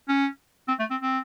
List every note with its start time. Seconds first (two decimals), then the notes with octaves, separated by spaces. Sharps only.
0.08 C#4
0.68 C4
0.80 A3
0.91 C4
1.02 C4